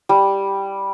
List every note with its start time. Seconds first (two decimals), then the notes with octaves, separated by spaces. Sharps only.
0.09 G3